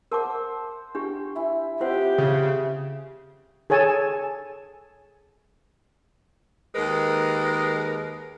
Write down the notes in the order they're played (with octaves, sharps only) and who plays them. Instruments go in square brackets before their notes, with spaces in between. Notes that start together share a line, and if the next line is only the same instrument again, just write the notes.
[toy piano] A#4 A5 D6 [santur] C5 F#5 E6
[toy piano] D4 G4 [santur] G5
[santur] E4 G#5
[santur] C4 D#5 E5 [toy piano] F4 C5 F#5 [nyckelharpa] G4
[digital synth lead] C#3
[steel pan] G#4 A4 C#5 G#5 A5
[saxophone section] D#2 G#3 A#4 B4